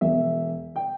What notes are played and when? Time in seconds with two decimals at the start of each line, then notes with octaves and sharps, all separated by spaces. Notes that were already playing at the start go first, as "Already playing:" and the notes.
0.01 E1 E5
0.76 G5